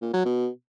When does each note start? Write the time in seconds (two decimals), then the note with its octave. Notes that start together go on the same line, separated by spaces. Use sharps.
0.02 A#2
0.13 F#3
0.25 B2